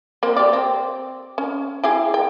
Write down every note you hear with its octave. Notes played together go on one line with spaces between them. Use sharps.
A#3 C4
G4 D5
C4
C#4
E4 G4 G#4
G5